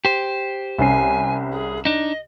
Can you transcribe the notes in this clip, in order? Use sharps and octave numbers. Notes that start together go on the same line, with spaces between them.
G4 C5
C2 C#4 G#5 C7
G#4
D4 D#4 D#5